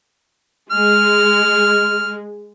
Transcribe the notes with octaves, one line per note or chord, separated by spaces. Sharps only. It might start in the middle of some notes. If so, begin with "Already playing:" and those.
G#3 F6